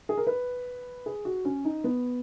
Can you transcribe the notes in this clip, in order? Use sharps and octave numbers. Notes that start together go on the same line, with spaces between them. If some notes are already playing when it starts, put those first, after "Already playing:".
G#4
A#4
B4
G#4
F#4
C#4
D#4
B3